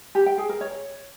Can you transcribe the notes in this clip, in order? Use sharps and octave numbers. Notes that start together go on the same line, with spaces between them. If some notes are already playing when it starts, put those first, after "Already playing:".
G4
G5
G#4
A#4
C#5